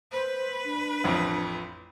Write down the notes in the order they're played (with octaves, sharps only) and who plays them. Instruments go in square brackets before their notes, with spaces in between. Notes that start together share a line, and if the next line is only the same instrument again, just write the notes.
[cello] B4 [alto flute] C5
[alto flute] D4
[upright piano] A1 F2